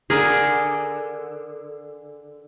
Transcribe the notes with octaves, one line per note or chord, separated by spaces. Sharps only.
D3 G#4 A#4